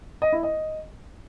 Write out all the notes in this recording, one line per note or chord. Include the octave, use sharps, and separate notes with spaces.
D#5
E4
D#5